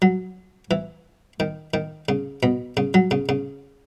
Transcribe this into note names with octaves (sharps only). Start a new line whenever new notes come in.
F#3
E3
D#3
D#3
C#3
B2
C#3
F#3
C#3
C#3